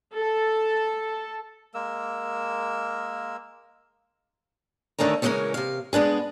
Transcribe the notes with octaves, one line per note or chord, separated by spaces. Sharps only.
A4
G#3 A#3 A#4 E6
D3 D#3 A3 C#4 A#5
C#3 E3 G#3 C4 C#4 A#4
C3 F5
G#3 B3 D4 G#4